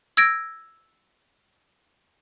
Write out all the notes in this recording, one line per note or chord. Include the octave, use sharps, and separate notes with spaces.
E6 G#6 A#6 D7